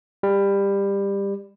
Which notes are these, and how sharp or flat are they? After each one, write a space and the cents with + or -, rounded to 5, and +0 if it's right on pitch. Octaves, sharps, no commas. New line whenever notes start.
G3 +20